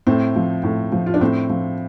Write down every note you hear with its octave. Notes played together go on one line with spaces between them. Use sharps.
A2 C4
F3
A2
F3
F4
D4
A2 C4
F3